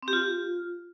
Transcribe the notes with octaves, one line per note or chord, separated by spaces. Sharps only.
C4
G4
F4